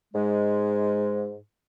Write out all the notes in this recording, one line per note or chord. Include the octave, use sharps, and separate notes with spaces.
G#2 G#3